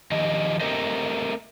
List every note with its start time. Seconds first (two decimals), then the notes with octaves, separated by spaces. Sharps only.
0.11 D#3 F3 G4 D#5
0.60 A3 C4 G4 A#4 C5 D#5